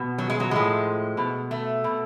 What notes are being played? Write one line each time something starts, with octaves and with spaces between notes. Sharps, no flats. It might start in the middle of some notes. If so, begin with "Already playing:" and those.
Already playing: B2
F#3
G#3
F#3
A2 F3 G#3
B2
A3
B2